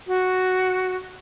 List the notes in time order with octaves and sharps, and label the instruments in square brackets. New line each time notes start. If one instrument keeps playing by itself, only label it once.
[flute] F#4